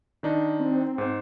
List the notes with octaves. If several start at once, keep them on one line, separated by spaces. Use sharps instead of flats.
D#3 D4 D#4
C4
G#2 C5